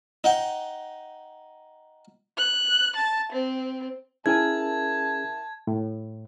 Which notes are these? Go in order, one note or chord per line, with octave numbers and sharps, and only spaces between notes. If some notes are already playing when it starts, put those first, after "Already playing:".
D#4 F#5 G5
F#6
A5
C4
C#4 E4 G#4 A#4 G#5 A5 G#6
A2